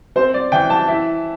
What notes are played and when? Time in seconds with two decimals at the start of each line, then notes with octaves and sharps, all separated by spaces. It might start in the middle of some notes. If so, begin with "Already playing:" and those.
0.16 C4 C5
0.34 D5
0.52 E3 G5
0.70 A5
0.88 E4